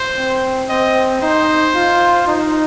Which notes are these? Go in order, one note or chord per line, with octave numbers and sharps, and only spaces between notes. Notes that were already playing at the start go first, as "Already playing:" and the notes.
Already playing: C5
C4
C4 D#5
D#4 C5
F4
D#4